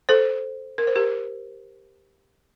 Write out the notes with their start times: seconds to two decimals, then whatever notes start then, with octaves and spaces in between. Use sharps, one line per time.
0.09 A4 C5
0.78 A#4
0.87 C5
0.96 G4 A#4